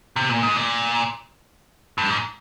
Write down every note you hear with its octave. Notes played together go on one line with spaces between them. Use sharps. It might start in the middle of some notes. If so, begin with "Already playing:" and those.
C3
A#2
G#2
A#2
G2
G#2